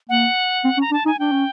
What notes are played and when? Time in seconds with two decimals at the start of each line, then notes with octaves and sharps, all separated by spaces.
0.09 A#3 F#5
0.64 C4
0.77 C#4
0.81 A#5
0.91 D4 A5
1.05 D#4 G#5
1.19 D4 G5
1.32 C#4